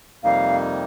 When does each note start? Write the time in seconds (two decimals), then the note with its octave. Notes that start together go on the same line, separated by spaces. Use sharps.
0.24 F2 C3 G3 A#3 D#4 F5